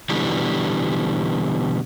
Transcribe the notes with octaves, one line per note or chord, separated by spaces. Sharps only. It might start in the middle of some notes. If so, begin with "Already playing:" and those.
B2 D3 E3 G3